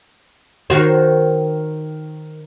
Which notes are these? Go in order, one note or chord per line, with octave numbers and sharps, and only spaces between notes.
D#3 F#4 C5